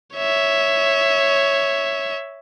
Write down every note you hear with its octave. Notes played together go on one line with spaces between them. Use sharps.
C#5 E5